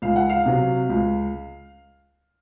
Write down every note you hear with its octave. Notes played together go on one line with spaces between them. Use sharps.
C#2 F5
F#5
F5
C3 F#3
C#2